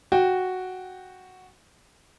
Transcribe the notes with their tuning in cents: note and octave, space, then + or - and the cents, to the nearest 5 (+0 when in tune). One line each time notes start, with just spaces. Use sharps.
F#4 +0 G5 +0